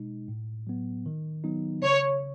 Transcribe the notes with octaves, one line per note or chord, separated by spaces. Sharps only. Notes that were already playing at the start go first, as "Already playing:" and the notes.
Already playing: B2 G#3 D#4
A2
F#3 B3
D#3
F#3 B3 D#4
C#3 C#5